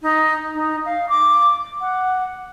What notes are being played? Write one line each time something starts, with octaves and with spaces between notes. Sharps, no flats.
D#4
D#4
F5
D6
F#5